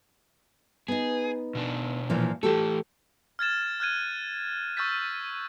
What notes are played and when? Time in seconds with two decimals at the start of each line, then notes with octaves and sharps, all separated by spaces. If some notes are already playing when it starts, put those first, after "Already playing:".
0.88 B3 D#4 G#4
1.55 B2 D4
2.10 A#2 E3 F3
2.43 E3 A3 F4 G4 A4
3.39 F6 G#6 A6 E7
3.80 F6 F#6 G#6 D#7
4.77 C#6 E6 F6 G6 A6 B6